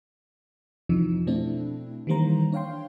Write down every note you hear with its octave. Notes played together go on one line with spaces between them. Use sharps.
F2 C3 E3 F3 D#4
B2 A3 C4 D4 E4
D#3 E3 G3 A#3 C5 A#5
D4 C#5 F5 G5 C6